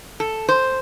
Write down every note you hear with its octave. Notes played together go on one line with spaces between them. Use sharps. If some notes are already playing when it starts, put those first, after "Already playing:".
A4
C5